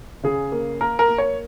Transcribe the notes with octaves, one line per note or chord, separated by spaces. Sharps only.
C#3 G#4
A#3
A#3 A#4
A#4
A#3
C#5